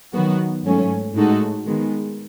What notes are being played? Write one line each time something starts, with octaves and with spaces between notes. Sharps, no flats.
D#3 F#3 B3 F#4
G#2 F#3 A3 C#4
A2 G#3 D#4 F#4 A4
D#3 G#3 B3